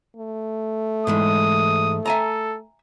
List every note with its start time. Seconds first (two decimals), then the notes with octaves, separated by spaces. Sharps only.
0.17 A3
1.07 G#2 E3 G#3 D#6
2.06 A4 E5 G#5 A#5